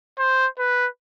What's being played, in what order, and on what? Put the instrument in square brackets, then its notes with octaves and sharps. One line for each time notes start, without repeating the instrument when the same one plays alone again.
[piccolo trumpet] C5
B4